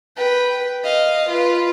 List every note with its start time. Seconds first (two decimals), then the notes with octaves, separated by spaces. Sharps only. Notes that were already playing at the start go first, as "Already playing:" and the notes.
0.16 B4 G5
0.83 D#5 F5
1.28 F4 B4